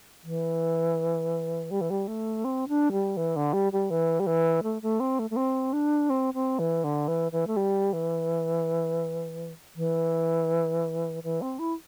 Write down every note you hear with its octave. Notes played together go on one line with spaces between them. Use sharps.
E3
G3
E3
G3
A3
C4
D4
G3
E3
D3
G3
G3
E3
G3
E3
A3
A3
C4
A3
A3
C4
D4
C4
C4
E3
D3
E3
E3
A3
G3
E3
E3
E3
C4
E4